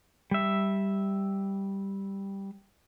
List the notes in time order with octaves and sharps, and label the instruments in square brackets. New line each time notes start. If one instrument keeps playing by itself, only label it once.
[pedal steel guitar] G3 E5